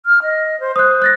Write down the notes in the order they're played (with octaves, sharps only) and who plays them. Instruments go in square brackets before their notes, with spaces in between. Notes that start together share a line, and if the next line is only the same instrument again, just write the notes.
[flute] F6
D#5
C5
[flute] C5 [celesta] D#6 F#6
[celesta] F#6 A6 A#6